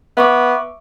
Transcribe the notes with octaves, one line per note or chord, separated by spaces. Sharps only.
B3 E5 C#6 D6